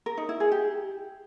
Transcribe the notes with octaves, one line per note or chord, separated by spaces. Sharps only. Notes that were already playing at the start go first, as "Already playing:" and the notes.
A#4
D#4
E4
G#4
G4